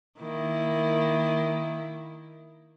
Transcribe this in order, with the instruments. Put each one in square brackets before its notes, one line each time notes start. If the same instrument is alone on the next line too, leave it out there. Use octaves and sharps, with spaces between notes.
[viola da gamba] D#3 A#3 E4